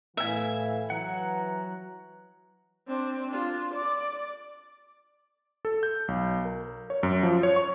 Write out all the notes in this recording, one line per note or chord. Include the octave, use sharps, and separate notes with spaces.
A2 E3 E5 F5 G#5
E3 F#3 F#5 A#5
C4 D4
D4 F4
D5 D6
A4
G6
B1
A#4
C#5
F#2
F3
C#5
C#6